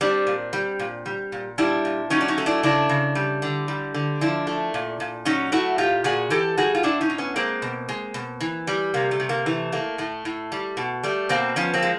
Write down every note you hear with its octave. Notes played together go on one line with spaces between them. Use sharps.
G3 C4 D4
A#2
G3
A#2
G3
A#2
G3 D4 E4
A#2
F#3 C#4 D#4
D4
C#4 D#4
A3
D4 E4
C#3 D4 E4
C#3
G3
D3
G3
D3
F3 D4 E4
A3
A#2
A#2
F#3 C#4 D#4
A3 E4 F#4
A#2 F4 G4
A#2 F#4 G#4
E3 G4 A4
G3 F#4 G#4
F4
A2 D4 E4
C#4 D#4
A2
B3 C#4
G#3 A#3 C4
B2
G#3
B2
E3
G3
C3 A#3
A3
C3
A#3
E3 A3
A3 A#3
A2 A3
A2
G3
B2
G3 A3
B2 A#3 C4
F3 B3 C#4
A#3 C4
G#3